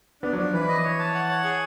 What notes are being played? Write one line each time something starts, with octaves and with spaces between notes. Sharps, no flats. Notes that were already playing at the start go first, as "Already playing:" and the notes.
B3 D4
F#3
F3 D4
E3 B4
D#5
C#5
A5
F#5
C#5
G#4